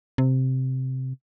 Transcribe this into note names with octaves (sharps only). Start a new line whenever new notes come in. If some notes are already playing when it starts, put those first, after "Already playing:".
C3